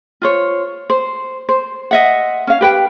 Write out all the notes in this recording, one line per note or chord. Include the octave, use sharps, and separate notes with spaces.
F4 C5 C#5
C5
C5
D#5 E5 F#5
C#4 F5
G4 B4 G5